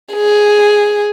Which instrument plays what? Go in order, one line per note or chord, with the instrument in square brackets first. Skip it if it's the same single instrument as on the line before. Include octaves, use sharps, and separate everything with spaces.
[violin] G#4